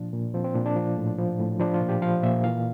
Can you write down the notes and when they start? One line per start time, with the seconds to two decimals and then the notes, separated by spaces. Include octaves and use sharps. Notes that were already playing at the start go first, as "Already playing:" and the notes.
Already playing: A#2 F3 D4
0.13 A#2
0.34 F3 C4
0.44 C4
0.55 A#2 D4
0.66 D4
0.76 F3
0.97 A2
1.18 F3
1.40 A2
1.60 F3 D4
1.74 F4
1.81 A#2
1.89 G4
2.02 F3 F5
2.23 A#2 E5
2.44 E3 F5